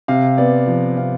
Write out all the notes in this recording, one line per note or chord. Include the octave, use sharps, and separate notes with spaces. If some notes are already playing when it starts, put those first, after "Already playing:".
C3 F5
B3 D5
F3
C3 F5